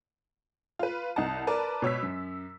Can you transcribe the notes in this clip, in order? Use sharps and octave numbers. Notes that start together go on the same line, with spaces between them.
F4 B4
C2 D#4 F#5 A5
A#4 B4 D5 A5
B2 C#5 E6 B6
F#2